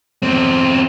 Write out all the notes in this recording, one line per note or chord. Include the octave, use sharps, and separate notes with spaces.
E2 C4